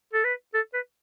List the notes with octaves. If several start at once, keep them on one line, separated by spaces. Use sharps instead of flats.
A4
B4
A4
B4